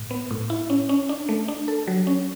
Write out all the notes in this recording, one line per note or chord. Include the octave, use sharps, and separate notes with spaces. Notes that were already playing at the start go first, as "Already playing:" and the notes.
Already playing: A2
B3
A2
E4
C#4
C#4
D4
A3
D4
A4
F#3
C#4